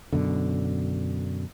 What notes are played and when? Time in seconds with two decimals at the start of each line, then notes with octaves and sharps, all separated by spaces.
0.13 F#2 B2 D3